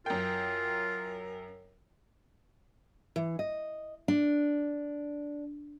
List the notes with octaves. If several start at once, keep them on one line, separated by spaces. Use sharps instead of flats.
F#2 F4 A#4 G5
E3
D#5
D4